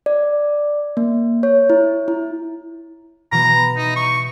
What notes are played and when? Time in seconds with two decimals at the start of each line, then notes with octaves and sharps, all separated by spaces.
0.06 D5
0.97 A#3
1.43 C#5
1.70 E4
2.08 E4
3.32 B2 E3 B3 A#5
3.77 D#4
3.96 C#6